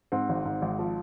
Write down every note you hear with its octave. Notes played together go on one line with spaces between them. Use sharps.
G#2 C4
G#1
G#2
G#1
F3